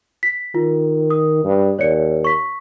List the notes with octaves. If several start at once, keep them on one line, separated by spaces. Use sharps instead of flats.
B6
D#3 F4
D#6
G2
D#2 C#5 D5 C#7
C#6 B6